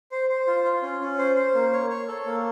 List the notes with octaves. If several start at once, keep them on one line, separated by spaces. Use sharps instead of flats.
C5
C5
F4
F4
C#4
C#4
C5
C5
A#3
C#5
C#5
A4
A#3